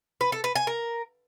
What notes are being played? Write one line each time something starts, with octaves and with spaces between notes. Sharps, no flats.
B4
A4
B4
G#5
A#4